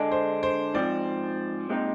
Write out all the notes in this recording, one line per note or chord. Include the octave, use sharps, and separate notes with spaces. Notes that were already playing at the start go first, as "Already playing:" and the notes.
Already playing: D3 G#3 D4
C5
C5
G#2 F3 C4 D5
A#2 G#3 C4 D#4